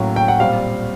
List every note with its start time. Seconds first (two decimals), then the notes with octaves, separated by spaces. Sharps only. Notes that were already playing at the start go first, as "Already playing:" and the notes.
Already playing: A2 F#3 A#3 C#4
0.16 G5
0.28 F#5
0.40 A#2 G3 C4 F5